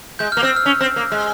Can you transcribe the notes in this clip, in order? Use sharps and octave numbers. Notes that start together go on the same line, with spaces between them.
G#3 G6
A#3 F6
C4 E6
F6
C#4
C4
A#3
G#3